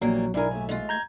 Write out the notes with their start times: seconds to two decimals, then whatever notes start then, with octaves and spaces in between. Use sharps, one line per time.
0.01 A#1 E3 F#3 G3 A#3
0.34 B1 G#2 D4 E4 A#4 G#5
0.51 D#2 A3
0.69 G#3 F4
0.89 A#5 G6 G#6